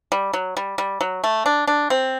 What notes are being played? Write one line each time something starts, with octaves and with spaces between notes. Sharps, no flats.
G3
F#3
G3
G3
F#3
A3
D4
D4
C4